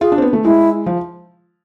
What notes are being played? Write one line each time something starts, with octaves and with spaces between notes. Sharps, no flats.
F4 G#4
D4
C4
B3
A3
G#3 E4
F3